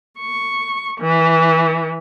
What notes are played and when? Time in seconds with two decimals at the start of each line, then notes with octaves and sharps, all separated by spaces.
0.19 C#6
1.01 E3